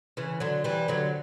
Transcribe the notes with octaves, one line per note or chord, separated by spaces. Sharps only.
C#3 E3
D3 F#3
E3 G3
D3 F#3